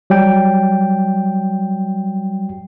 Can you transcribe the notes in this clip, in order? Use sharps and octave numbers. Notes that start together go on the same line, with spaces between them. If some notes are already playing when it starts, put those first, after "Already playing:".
F#3 G3 G5